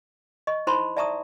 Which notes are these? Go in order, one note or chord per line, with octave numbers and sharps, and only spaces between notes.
D#5 C#6
D#4 E4 C5 A5 B5 C6
D5 E5 A5 A#5 C#6 D#6